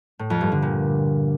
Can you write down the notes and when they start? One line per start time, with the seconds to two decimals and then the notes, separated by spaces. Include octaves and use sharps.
0.19 A2
0.30 F2
0.41 G2
0.52 D3
0.62 A#2